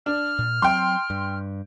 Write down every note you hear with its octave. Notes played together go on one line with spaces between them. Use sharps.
D4 F6
A#2
F#3 C4 G5 C6
G2